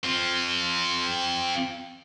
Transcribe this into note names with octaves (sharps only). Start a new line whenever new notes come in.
C4 F4